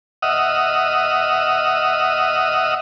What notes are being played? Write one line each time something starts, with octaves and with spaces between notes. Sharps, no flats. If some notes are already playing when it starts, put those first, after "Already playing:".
D#5 E5 F#5 D#6 F6